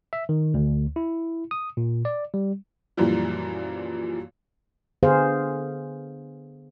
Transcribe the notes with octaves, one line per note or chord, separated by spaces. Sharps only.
E5
D#3
D2
E4
D#6
A#2
D5
G3
F#2 A#2 E3 F3 G3
D3 B3 G#4 C5 F5